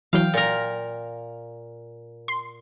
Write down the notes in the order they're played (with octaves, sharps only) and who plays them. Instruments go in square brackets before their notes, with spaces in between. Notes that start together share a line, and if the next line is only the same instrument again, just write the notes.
[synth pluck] E3 F#3 [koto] F5 G5
[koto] A#2 A#4
[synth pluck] C6